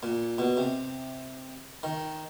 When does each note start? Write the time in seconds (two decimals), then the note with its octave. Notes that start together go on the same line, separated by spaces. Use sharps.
0.03 A#2
0.38 B2
0.57 C3
1.83 D#3